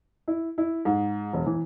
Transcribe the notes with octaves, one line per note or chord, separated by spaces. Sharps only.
E4
E4
G#2
E1
E3